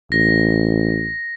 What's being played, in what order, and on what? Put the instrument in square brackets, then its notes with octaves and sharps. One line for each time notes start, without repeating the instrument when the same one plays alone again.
[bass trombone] A1 [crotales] A#6